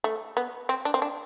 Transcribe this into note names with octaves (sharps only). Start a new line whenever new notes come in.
A3
B3
C4
D4
C4
D4